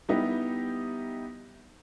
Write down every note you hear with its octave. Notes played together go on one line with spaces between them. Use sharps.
G3 B3 D#4 E4 G4